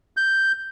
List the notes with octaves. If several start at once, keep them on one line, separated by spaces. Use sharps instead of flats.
G6